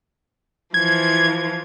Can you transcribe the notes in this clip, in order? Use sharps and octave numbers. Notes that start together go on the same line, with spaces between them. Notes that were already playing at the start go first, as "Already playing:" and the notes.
E3 F3 G#6